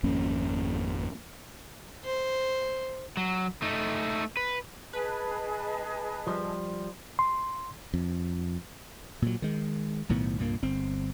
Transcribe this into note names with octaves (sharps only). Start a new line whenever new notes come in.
G#1 F2 A#3 C#4
C5
F#3
A3 D#4
B4
G#4 B4 D#5 A5
F3 G3
C6
F2
A#2 F#3
D#3 G#3
B1 A2 D#3 B3
C2 G2 A#2 A#3
G1 C4